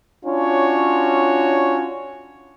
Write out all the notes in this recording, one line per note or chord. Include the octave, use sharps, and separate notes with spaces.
C#4 D4 F4 F#4 C#5